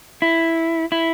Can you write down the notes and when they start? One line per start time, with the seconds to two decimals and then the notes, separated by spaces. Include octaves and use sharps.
0.22 E4
0.92 E4